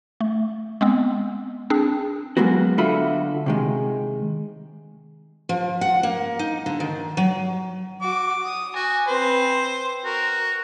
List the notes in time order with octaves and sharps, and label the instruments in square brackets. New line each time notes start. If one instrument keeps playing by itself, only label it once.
[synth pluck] A3
G#3 B3 C4
C4 D4 G#4
[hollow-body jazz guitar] F#3 G#3 A#3 B3 F#4
D3 F4 F#4 A4 E5 B5
C3 D#3 G#3
[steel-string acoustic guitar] F3
F#5
A#3
D#4
D3
D#3
F#3
[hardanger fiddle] F#4 [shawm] D6
[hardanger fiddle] D#6
[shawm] F#4 [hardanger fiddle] G#5
[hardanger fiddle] C4 B4 [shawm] C5
[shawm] F#4 [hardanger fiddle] A#4